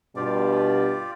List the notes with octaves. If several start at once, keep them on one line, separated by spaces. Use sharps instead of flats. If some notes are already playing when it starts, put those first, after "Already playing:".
G2 B2 F4 G4 D5